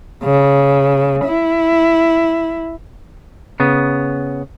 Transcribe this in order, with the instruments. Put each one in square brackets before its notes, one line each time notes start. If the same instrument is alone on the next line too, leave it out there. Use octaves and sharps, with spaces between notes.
[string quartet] C#3
E4
[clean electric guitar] C#3 B3